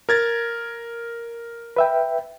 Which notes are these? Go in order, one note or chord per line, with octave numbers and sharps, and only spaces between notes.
A#4 G#6 A6
B4 E5 G5